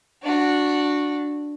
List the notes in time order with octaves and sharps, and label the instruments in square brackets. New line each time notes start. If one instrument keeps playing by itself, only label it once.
[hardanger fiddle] D4 F#4